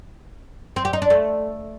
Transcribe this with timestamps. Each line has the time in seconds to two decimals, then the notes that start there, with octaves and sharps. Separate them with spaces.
0.76 C4
0.85 G4
0.93 D#4
1.02 D4
1.10 A3